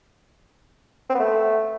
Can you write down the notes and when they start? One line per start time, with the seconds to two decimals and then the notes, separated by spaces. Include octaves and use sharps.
1.10 C4
1.15 B3
1.20 A3